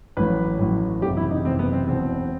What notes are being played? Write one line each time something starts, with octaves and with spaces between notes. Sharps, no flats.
A1 A2 F#3 B4
A1 A2 F#3
F#1 E2 C3 G4
E4
D#4
F#1 E2 C3 C4
B3
C4
E1 E2 B2 C4